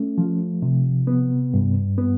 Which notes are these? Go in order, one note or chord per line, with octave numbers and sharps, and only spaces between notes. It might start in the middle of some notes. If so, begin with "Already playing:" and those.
Already playing: A3 C#4
F3
C3
B3
G2
B3